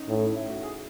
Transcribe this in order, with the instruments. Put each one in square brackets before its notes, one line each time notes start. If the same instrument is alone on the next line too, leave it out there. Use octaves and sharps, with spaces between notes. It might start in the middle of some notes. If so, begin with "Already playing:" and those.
Already playing: [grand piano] C#4 D#4
[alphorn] A2
[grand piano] E4
F#4
G#4